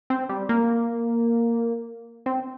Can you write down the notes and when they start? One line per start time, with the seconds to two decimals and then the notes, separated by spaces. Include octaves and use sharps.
0.10 C4
0.29 G3
0.49 A#3
2.26 C4